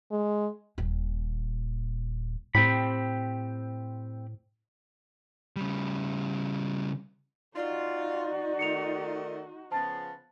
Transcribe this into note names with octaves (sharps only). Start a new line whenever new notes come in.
G#3
D#1 A#2
A2 C4 G4 B5
C#3 G3
D#4 F4 F#4 D5
D#3 A3 C#7 F7
C#3 F3 B3 A5 A6